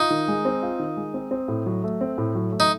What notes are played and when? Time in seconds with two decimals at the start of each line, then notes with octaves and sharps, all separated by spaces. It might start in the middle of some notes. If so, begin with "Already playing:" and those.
Already playing: D#4 F4
0.10 D#3
0.28 G#3
0.45 C4
0.63 F4
0.79 D#3
0.97 G#3
1.14 C4
1.31 C4
1.48 A2
1.66 F#3
1.84 A3
2.01 C4
2.18 A2
2.35 F#3
2.52 A3
2.60 D#4